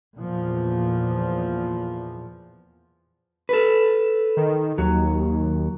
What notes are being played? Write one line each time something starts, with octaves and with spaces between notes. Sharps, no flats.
E2 A#2 F3
A4 B4
D#3
D#2 F#3